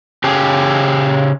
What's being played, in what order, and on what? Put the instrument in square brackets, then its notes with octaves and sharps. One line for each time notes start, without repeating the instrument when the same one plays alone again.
[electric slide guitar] C#3 G4 G#4